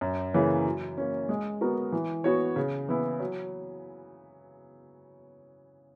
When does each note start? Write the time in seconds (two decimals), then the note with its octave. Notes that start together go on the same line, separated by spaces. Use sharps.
0.01 F#2
0.34 C#3 E3 A#3 C#4
0.65 F#3
0.98 A#3 C#4
1.29 G#3
1.61 B3 F#4 A#4
1.92 E3
2.24 B3 F#4 C#5
2.56 C#3
2.89 E3 B3 E4 B4
3.20 F#3